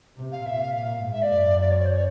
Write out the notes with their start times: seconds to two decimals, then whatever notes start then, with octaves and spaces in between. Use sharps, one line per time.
0.18 C3
0.32 F5
0.46 A#2 E5
0.60 F5
0.74 A#2 F5
1.03 G#2
1.13 E5
1.22 D5
1.32 F#2
1.61 D5
1.71 C#5
1.80 D5
1.85 C5
1.90 C#5